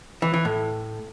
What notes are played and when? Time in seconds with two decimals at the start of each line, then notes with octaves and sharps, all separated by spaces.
0.22 E3
0.34 E3
0.45 A2